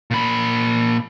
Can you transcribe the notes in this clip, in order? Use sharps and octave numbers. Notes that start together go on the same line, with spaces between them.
A#2 B5